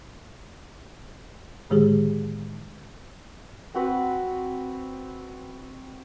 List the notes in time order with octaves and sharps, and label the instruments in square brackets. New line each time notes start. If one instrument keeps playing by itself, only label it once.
[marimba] A2 D3 D#3 G#3 G4 G#4
[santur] C4 F#4 B4